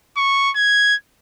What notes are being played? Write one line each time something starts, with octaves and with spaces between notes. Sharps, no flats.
C#6
G#6